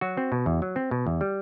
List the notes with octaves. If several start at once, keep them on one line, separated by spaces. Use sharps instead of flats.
F#3 F#4
C4
B2
E2
F#3
C4
B2
E2
G3